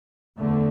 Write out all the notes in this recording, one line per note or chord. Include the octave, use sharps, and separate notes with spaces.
E2 D3 A3